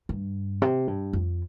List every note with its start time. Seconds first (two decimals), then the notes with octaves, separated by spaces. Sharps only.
0.09 G2
0.62 C3
0.88 G2
1.13 F2